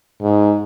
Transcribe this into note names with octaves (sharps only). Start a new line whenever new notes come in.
G#2